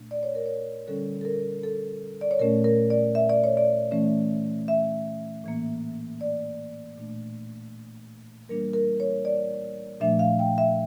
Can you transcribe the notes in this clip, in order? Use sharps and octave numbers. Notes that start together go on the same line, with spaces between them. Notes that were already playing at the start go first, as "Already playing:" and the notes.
Already playing: A#2 A3 D4
D5
C#5
A#4
C#5
D3 G3 C#4 A4
A4
A#4
A4
D5
C#5
A#2 A3 C#4 A#4
A#4
D5
E5
D5
C#5
D5
E3 A3 C#4
E5
A2 E3 A#3
D5
A#2 A3 D4
E3 G3 A#3 D4 A#4
A#4
C#5
D5
A#2 F3 A3 D4 E5
F5
G5
E5